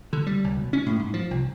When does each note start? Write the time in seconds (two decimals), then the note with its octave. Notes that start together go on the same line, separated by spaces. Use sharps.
0.13 D3
0.27 G3
0.44 C#2
0.57 B2
0.73 C#4
0.86 A2
0.99 G#2
1.14 F3
1.31 C2